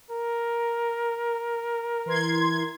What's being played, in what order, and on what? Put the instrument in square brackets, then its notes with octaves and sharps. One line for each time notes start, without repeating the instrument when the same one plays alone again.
[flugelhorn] A#4
[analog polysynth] E3 C6 G#6